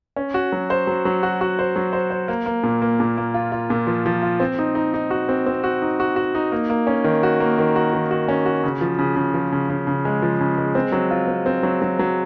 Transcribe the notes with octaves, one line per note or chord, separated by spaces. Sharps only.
C#4
F#4
F#3
C5
F#3
F#3
F#4
F#4
C5
F#3
C5
C5
A#3
A#3
A#2
A#3
A#2
A#3
F4
F4
A#2
F3
F3
F4
C4
D#4
D#4
D#4
F#4
C4
C4
F#4
D#4
F#4
F#4
D#4
A#3
A#3
C#4
D#3
F#4
A#3
D#3
F#4
D#3
F#4
C#4
F#4
C#3
F3
C#3
C#3
F3
C#3
C#3
C#3
G#3
F3
C#3
G#3
C4
F#3
F4
C4
C4
F#3
F#3
F#3